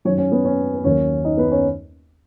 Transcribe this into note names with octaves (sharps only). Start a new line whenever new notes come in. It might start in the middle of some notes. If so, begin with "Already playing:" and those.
F#2 D#3 F#3 C#4 C#5
C#4 C#5
B3 B4
C#4 C#5
B4
D#2 D#3 F#3 A#3 C#4 C#5
D#4 D#5
B3 B4
C#4 C#5